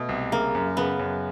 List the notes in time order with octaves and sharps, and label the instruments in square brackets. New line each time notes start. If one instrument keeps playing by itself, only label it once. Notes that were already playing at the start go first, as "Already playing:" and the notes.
Already playing: [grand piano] B2 [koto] A3
[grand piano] C2
[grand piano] C#3 [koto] A#3
[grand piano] F#2
[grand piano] C#3 [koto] B3
[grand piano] F#2